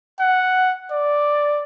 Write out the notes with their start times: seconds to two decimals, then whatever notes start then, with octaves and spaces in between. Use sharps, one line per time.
0.19 F#5
0.91 D5